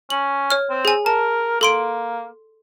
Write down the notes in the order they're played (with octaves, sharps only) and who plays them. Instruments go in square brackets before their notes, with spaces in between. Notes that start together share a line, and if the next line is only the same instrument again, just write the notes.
[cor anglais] C#4 [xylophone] F#7
[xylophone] C#5 F6
[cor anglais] C4
[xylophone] G#4 G#5
[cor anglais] A#4 [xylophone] A5
[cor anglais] A#3 [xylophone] A4 C6 D7